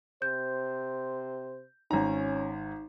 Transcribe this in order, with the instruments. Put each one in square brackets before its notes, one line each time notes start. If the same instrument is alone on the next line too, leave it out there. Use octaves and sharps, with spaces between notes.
[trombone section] C3 C5 [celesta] G6
[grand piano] G#1 A#5 [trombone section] C#4 [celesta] D#4